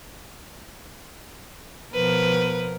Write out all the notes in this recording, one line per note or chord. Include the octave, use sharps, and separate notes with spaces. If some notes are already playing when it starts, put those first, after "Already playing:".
B2 F3 A#4 B4